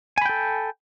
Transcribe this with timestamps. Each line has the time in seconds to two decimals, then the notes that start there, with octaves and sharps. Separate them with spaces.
0.18 G#5
0.22 B5
0.25 G5
0.29 A4